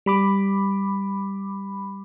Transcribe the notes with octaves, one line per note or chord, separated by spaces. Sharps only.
G3 B5 D6